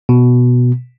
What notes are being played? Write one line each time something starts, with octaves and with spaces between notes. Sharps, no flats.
B2